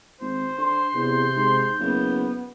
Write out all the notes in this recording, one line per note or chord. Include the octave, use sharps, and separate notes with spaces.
G#1 C5
D3 C6
E2 C3 G6
G#2
F#1 B3